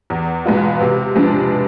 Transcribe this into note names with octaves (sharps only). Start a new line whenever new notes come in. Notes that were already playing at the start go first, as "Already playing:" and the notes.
E2
B2 G#3 B3 F4
C3
F3 G#3 B3 D4